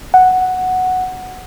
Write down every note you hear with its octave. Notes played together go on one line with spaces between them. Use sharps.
F#5